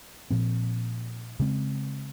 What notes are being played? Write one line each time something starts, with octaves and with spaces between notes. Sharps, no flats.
A#2 F3 C4
C#3 G#3 C4